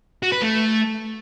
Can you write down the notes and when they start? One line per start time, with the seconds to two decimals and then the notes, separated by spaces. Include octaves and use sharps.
0.23 F#4
0.32 B4
0.42 A3